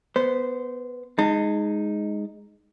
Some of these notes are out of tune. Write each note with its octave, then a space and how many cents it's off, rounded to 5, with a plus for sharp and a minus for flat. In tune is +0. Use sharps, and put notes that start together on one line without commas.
B3 +0 C5 -15
G#3 +0 D#4 +0 A5 +45